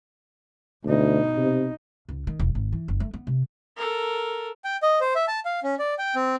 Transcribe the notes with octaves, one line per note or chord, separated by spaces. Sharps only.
D2 B2 D#4
C3
C#2
D#3
E1
G#1
E3
F#1
A3
B3
C3
A4 A#4
G5
D#5
C5
E5
A5
F5
C#4
D5
G5
C4